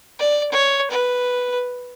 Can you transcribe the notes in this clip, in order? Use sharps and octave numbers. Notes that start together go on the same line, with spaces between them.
D5
C#5
B4